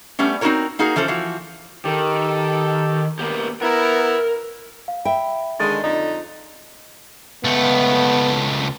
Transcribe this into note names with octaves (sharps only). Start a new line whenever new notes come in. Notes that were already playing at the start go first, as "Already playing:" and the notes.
G3 A3 B3 C#4
C4 D#4 F4 F#4 A#4 C#5
A#3 D#4 F#4 G#4 A#4
E3 F3 C#4 A4 C5
E3 F3 F#4
D#3 G4 A4
A#3 B3 G4
B3 E4 A#4
F5
E5 G5 B5
D3 D#3 G#3 A6
F2 D3 D#4
C#2 A3 B3